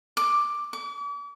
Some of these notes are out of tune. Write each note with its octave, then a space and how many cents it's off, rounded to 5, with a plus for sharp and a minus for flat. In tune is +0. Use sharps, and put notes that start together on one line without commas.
D6 +5
D6 -40